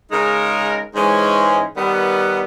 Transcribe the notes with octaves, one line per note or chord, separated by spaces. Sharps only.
C#3 G#3 D#4 A#4
G#2 E3 G#3 C#4
D#3 G3 B3